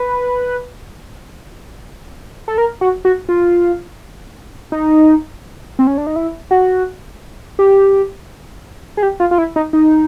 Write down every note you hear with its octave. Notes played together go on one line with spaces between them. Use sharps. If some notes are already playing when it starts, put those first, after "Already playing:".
Already playing: B4
A4
A#4
F#4
F#4
F4
D#4
C4
C#4
D4
D#4
E4
F#4
G4
G#4
G4
F4
F4
E4
D#4
D#4